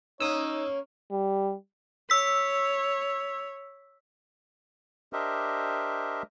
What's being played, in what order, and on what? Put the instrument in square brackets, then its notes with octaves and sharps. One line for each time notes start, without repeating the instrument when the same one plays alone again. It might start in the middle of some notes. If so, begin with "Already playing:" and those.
[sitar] A#3 C#4 [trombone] D#4 [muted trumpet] C#5 [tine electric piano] D#6 E6
[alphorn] G3
[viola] C#5 [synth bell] E6 B6
[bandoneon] D4 G4 A#4 C5 D#5 E5